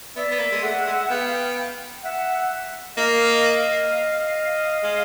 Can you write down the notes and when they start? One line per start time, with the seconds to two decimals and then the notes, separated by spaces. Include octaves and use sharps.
0.16 B3 D5 E5
0.31 B3
0.39 A#3
0.52 G#3
0.63 A3 E5 F#5
0.87 G#3
1.10 B3 F5 G5
2.04 E5 F#5
2.97 A#3 D#5 F5
4.84 G#3